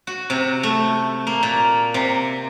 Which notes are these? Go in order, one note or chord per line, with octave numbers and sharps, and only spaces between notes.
F#4
C3
A3
A#3
A#2
C3